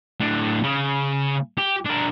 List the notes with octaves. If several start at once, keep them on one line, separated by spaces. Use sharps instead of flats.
A2 D4
C#3
G4
D4 A#4